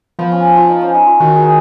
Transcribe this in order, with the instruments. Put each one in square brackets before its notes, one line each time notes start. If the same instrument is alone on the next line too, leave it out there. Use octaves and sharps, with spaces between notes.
[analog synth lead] F3 [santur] B3
[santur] C#4
F4
D#4
C#4
D#4
F4
[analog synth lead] D#3 [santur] F#4
[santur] G#4